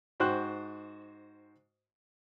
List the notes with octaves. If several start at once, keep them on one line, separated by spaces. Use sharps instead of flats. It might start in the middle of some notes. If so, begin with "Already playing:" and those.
G#2 F#4 C5 G5 F#6